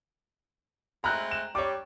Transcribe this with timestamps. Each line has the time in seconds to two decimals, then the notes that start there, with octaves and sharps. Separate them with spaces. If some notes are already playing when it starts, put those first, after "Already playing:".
1.04 G#3 A3 C4 A#5 B5 F#6
1.31 E7
1.55 G3 C#5 D6